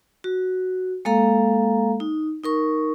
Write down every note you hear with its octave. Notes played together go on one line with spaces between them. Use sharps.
F#4
G#3 A#3 A4 F5 A#5
D#4
D#4 A#4 C#6